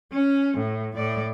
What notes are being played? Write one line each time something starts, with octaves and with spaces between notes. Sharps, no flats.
C#4
A2
A2 D5